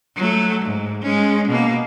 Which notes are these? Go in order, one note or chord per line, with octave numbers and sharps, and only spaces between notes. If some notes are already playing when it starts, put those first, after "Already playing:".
F#3 A3
G#2
G#3 C#4
B2 A#3